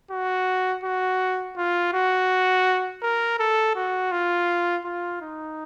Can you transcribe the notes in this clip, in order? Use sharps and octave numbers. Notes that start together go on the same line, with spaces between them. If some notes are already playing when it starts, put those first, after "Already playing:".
F#4
F#4
F4
F#4
A#4
A4
F#4
F4
F4
D#4